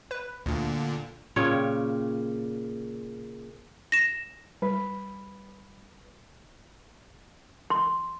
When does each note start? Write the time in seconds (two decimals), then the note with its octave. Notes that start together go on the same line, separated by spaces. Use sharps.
0.11 B4
0.46 D2 A#2 D3
1.36 A#2 C#3 C#5 G5
3.92 A#6 E7
4.62 G3 B4
7.70 C6